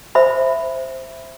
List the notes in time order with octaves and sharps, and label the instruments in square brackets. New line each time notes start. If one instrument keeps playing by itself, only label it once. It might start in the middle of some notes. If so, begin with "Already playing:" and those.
[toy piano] C5 E5 B5